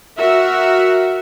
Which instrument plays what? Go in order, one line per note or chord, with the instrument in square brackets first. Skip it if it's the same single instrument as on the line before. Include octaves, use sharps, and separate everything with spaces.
[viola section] F#4 A#4 E5